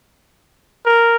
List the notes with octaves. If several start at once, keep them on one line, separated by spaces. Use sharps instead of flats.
A#4